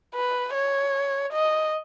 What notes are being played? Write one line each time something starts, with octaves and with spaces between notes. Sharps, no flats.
B4
C#5
D#5